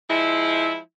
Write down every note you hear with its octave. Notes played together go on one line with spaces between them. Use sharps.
F3 G#3 E4